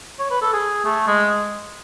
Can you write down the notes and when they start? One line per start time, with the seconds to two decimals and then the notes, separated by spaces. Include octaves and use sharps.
0.19 C#5
0.30 B4
0.41 A4
0.53 G#4
0.85 A3
1.07 G#3